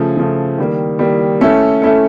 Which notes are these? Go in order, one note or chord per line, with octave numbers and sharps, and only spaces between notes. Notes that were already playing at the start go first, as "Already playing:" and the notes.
Already playing: C#3 F3 A3
C#3 F3 A3
D#3 G3 A#3
D#3 G3 A#3
A3 C#4 E4 A4
A3 C#4 E4 A4